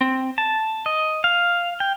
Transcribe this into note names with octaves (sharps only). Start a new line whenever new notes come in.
C4
A5
D#5
F5
G5